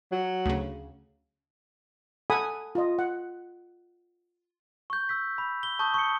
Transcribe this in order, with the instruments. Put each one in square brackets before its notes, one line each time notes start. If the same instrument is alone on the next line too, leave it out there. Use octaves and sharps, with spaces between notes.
[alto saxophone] F#3
[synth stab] D2 C#3
[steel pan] A4 F#5 G#5 B5 D#6
F4 D#5
F#5
[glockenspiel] C#6 G6
E6 G6 B6
B5
G7
A5 C#6 D#6 G6
C#6 D#6 C#7